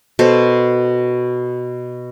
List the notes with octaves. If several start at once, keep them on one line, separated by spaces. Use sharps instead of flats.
B2 A4 C5